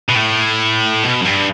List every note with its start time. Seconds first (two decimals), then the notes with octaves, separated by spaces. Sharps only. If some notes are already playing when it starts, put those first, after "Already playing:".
0.09 B2
0.16 A2
1.04 B2
1.21 F#2
1.25 G2